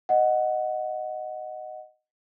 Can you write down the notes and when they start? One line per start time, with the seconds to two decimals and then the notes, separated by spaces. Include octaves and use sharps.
0.09 D#5 F#5